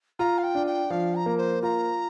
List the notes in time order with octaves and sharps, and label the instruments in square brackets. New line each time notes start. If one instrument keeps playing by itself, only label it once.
[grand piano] F4 [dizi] A#5
[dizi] F5
G5
[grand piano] D4
[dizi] G5
[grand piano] F3 [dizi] F5
[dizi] A#5
[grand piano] A#3
[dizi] C5
[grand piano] F4 [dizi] A#5